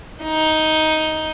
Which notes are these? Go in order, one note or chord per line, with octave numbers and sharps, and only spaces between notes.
D#4